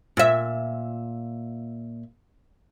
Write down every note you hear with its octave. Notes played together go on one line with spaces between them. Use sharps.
A#2 E5